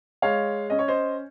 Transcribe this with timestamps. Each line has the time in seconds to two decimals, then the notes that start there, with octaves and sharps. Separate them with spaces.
0.22 G#3 C#5 F5
0.70 C#4 D#5
0.79 C#5
0.88 C5 D#5